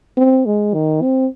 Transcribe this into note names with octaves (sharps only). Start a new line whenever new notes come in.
C4
G#3
D#3
C4